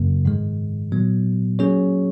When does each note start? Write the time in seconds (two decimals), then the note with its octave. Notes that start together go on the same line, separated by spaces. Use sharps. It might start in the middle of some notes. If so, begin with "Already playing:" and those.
Already playing: F#2 C#3 F#3 A#3
0.25 G#2 D#3 G#3
0.92 A#2 F#3 B3
1.59 F#3 A#3 C#4 G#4 C#5